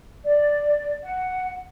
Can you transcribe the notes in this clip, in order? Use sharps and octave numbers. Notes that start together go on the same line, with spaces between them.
D5
F#5